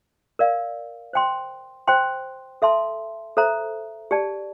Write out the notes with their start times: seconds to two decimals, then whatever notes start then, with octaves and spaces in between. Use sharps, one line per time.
0.39 A#4 D5 F5
1.13 C5 G5 C6
1.88 C5 G5 C6
2.62 A4 E5 A5 C6
3.37 A4 C5 E5 A#5
4.11 G4 D5 A5